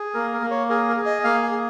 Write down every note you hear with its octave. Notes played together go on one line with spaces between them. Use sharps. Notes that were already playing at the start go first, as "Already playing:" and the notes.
Already playing: G#4
A#3 A#4
A#4
A#3
C#5
G#4 A#4
A#4
G#4
D#5
A#3 F5
G#5
G#4